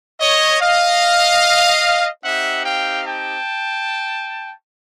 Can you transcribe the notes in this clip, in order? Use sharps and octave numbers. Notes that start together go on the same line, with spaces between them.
C#5 D#5
D#5 F5
C4 D#4 G4 E5 F#5
F5 G5
G5 A5